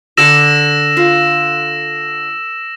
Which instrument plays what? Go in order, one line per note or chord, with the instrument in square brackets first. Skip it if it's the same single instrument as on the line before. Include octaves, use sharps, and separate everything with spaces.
[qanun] D3 A4 D6 [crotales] E6 A#6 E7
[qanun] F4